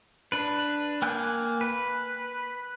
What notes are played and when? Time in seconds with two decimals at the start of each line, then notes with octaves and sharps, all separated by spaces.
0.32 D4 B4
1.02 A#3 G5 G#5 F#6 G6
1.61 B4